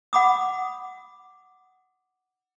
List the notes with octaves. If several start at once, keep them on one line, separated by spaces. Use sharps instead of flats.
F#5 B5 D6 D#6